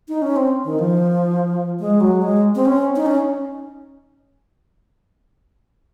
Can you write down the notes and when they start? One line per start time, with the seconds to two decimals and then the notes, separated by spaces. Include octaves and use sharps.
0.09 D#4
0.22 C#4
0.36 C4
0.65 D#3
0.79 F3
1.80 G#3
2.00 F#3
2.22 G#3
2.55 C4
2.65 C#4
2.96 D#4
3.06 C#4